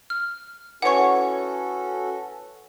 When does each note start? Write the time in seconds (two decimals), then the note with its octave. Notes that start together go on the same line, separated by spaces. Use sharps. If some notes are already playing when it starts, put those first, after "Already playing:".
0.10 F6
0.82 E3 C#4 F#4 A4 C#5 F#5 C#6